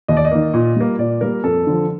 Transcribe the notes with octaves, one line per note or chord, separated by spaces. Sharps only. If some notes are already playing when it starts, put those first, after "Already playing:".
D#2 D#5
D5
D#5
D#3 A#3
A#2
G3 A#3
A#2 D5
G3 A#3 A#4
F2 A4
D3 F3